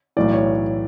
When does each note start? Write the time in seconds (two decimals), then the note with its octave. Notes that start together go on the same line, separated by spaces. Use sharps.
0.17 B1 A2 E3 D5
0.32 C#5